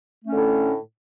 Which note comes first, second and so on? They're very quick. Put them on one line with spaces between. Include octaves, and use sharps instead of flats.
A3 C#4 D3 A2